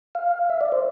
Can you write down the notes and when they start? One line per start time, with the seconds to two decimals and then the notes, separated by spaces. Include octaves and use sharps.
0.15 F5
0.50 E5
0.61 D5
0.72 C5